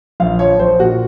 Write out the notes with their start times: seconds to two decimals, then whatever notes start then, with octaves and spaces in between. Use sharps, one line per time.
0.20 A#1 F5
0.39 F3 C#5
0.59 A#1 C5
0.79 A#2 F#4